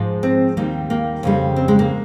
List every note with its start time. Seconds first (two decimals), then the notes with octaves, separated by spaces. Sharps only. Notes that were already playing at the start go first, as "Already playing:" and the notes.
Already playing: G#2 F3 G#3
0.23 C4
0.57 D#2 D#3 G3 A#3
0.90 A#3
1.23 F2 C#3 G3
1.56 C4
1.68 G#3
1.79 A#3